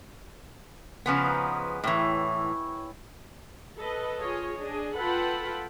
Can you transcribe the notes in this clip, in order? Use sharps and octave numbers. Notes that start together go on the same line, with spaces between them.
C#3 F3 B3 G#4 B4 C5
D#4 F#5
A2 E3 E4 C#5 G5
A4 B4 D#5
F4 G#4 C#5 D#5
D4 G#4 D#5
F4 A4 B4 F#5 G5 B5